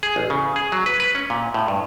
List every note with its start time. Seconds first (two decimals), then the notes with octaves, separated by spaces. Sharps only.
0.03 G#4
0.16 A1
0.30 C#3
0.56 G#4
0.72 F#3
0.86 B4
1.00 B4
1.15 C#4
1.30 A#2
1.54 A2
1.68 G2